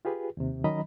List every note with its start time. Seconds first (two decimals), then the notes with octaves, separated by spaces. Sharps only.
0.05 F4 G4 G#4 B4
0.37 D#2 C3
0.64 D#3 F#3 C#4 D#5 A#5 B5